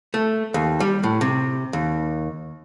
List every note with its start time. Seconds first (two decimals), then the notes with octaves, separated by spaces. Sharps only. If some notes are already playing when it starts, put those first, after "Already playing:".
0.14 A3
0.54 D#2
0.80 G3
1.04 A2
1.21 C3
1.73 D#2